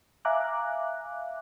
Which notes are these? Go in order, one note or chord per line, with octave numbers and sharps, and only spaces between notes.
E5 F5 G#5 A#5 D6 F#6